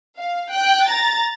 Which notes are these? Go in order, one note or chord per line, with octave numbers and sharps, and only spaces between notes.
F5
G5 F#6
A#5 A6